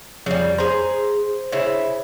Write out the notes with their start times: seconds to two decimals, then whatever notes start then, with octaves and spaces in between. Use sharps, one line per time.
0.26 F2 C#3 G3
0.58 G#4 C5 A#5
1.52 C#3 E4